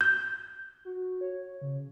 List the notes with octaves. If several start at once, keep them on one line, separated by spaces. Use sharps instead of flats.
G6
F#4
C#5
C#3